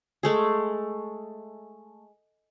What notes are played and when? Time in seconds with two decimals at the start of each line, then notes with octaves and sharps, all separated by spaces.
0.23 G#3 A3 G#4